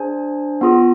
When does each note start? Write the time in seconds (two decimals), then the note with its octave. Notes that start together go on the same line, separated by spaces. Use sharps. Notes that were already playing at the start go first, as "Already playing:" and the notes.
Already playing: D4 G#4 C5 G#5
0.61 B3 F4 G#4